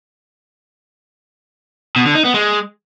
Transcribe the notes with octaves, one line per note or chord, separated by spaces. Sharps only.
B2
D3
D#4
B3
G#3